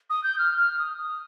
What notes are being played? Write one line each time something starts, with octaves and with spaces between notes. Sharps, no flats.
D#6
G6
F6
F6
D#6
D#6